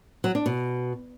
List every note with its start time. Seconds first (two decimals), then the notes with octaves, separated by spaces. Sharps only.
0.24 F#3
0.35 D4
0.46 B2